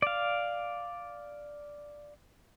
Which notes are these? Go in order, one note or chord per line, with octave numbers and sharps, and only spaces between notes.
D5 F5